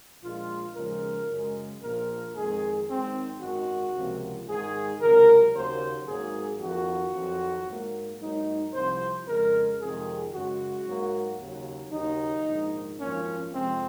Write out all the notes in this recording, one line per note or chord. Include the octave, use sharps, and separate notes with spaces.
A#1 A#2 G#3 F4
D#2 C#3 F3 G#3 A#4
F#2 C#3 G#3
A#1 A#2 F3 A#3 A#4
F2 D#3 G#3 G#4
G#1 G#2 D#3 F#3 C4
G#1 F#2 D#3 G#3 F#4
C#2 C3 F3 A#3
G#2 D#3 G#3 G#4
C#2 C3 F#3 A#4
D#2 C#3 F#3 A#3 C5
G#1 G#2 F#3 A#3 G#4
F2 D#3 A#3 F#4
F2 D#3 F#3
G#2 F#3 A#3
G#2 F#3 A#3 D#4
C2 C3 F3 C5
F2 C#3 G#3 A#4
F2 C3 D#3 G#3 G#4
F#2 C#3 G#3 F#4
G#2 F#3 A#3
D#2 C#3 F#3
D#2 C#3 F#3 D#4
A#1 G#2 D#3
G#1 F#2 F3 A#3 C#4
F2 C3 F3 G#3 C4